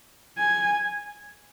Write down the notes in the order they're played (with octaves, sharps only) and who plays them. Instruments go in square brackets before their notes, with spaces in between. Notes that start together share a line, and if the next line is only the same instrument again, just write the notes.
[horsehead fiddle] G#5